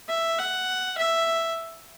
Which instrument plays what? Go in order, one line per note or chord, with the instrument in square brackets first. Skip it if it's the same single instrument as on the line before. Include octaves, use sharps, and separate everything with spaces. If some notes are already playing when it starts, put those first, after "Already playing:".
[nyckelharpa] E5
F#5
E5